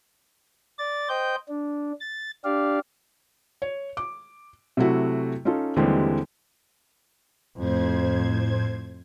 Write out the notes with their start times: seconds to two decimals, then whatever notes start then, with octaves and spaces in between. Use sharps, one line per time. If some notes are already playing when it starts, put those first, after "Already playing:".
0.78 D5 A6
1.09 C5 D#5 G5 G6
1.48 D4
2.00 A6
2.44 D4 G4 D5 F5
3.62 C#5
3.97 D6
4.77 C3 F#3 A3 E4 F#4
5.45 C#4 D#4 F4 A4
5.76 D#2 D3 E3 G3 G#3 C4
7.58 F2 A2 C5 G#6